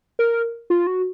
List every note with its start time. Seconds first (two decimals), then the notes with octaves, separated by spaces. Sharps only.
0.19 A#4
0.70 F4
0.87 F#4